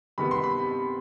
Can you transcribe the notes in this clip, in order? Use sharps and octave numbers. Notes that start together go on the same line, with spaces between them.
C3 D#3 G3 B3 B5
C6
B5